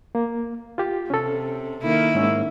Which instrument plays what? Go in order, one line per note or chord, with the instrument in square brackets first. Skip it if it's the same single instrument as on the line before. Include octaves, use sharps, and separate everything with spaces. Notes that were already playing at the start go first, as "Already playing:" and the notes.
[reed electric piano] A#3
F4 G4
[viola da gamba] C3 [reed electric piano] C#4 A4
[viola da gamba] D#3 A#3 E4
[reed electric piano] G#2 C#4 E6